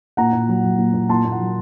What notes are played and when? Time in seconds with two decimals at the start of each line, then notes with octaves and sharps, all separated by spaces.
0.17 A#2 F#5 A#5
0.33 A#2
0.49 F#3
0.64 F#3
0.78 A#2
0.94 A#2
1.09 A#2 A5 C6
1.25 A#2
1.32 F#5 A#5
1.40 F#3